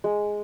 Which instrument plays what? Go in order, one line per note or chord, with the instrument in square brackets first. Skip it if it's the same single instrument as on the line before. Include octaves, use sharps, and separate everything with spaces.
[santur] G#3